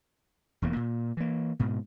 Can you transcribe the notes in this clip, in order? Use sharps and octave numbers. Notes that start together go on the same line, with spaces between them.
E1 E2 F3 A#3
A#2
E3 A#3
G#2 B2